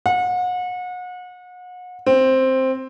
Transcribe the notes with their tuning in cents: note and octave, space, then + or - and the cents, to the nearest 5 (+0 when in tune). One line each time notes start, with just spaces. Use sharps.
F#5 -35
C4 +5